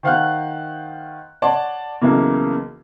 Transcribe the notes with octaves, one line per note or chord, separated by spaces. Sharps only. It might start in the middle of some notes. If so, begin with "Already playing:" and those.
D#3 C5 F5 F#5 F6 F#6
C#5 D5 F#5 A5 C6 D6
B1 C#3 E3 A#3